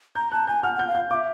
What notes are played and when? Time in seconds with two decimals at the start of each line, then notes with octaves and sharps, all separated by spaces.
0.15 A#5 G6
0.31 A5 F#6
0.47 G#5 G6
0.63 F#5 F6
0.75 F#5 G6
0.88 F5
0.95 G6
1.10 F5 D6
1.14 E5